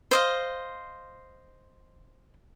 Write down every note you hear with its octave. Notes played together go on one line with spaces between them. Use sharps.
C5 D#5 F5